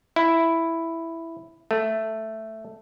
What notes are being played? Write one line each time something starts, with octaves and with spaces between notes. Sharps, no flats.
E4
A3